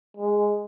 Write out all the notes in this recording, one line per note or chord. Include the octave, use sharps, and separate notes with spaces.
G#3